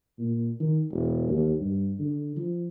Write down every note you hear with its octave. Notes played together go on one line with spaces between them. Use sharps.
A#2
D#3
E1
D#2
G2
D3
F3